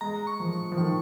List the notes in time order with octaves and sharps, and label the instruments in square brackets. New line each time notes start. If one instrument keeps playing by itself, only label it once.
[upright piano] G#3 [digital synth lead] A#5
[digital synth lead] C#6
[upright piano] F3
[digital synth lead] C#6
[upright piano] F3
[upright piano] D#3 [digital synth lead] C#6